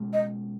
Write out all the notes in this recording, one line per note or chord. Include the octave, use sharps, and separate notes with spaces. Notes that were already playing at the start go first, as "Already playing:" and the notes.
Already playing: B2 G#3 C#4
D#5